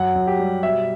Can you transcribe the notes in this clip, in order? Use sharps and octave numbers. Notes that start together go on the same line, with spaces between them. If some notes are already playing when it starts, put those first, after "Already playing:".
Already playing: F#2 F#5
F#2
G4
G3
B2 E5